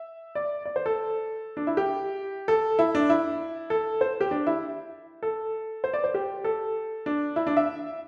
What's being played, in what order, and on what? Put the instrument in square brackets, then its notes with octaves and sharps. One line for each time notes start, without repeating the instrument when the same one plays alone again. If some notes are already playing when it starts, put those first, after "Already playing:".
Already playing: [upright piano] E5
D5
D5
C5
A4
D4
E4
G4
A4
E4
D4
E4
A4
C5
G4
D4
E4
A4
C5
D5
C5
G4
A4
D4
E4
D4
E5